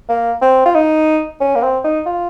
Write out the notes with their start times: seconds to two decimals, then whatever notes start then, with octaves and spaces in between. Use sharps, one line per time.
0.09 A#3
0.42 C4
0.66 F4
0.75 D#4
1.40 C#4
1.55 A#3
1.63 C4
1.84 D#4
2.06 F4